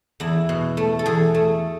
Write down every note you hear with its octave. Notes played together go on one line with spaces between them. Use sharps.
E2 E4
B2
A3
A4
E2 G#4
A3